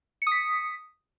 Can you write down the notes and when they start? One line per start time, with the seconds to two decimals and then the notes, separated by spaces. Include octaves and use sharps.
0.22 C#7
0.27 D#6
0.32 B6